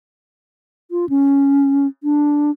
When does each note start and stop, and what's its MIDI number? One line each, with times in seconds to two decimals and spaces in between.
0.91 1.09 65
1.09 1.87 61
2.03 2.51 62